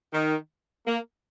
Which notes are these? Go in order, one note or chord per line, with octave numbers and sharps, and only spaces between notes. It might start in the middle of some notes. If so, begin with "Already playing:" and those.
D#3
A#3